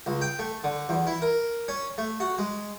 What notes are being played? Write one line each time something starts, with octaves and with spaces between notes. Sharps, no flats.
C#2
G5
A3
D3
E2
E4
A#4
C#4
A3
F#4
G#3